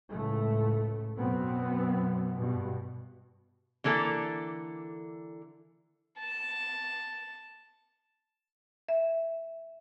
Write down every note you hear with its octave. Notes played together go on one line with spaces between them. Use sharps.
C#2 A2 A3
F#2 B2 B3 C4
G2 B2
D3 E3 A#3 A4
A5
E5